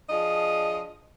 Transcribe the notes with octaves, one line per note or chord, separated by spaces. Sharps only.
F3 D4 G#4 D#5